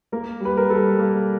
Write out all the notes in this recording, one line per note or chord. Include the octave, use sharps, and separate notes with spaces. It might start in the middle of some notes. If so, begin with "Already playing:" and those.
A#3 A#4
G3 B4
A#4
G3 A4
A#3